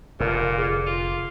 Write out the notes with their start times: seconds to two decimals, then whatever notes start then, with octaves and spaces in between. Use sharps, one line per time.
0.20 F1 A#2 D3 A#4
0.59 G#4
0.86 F4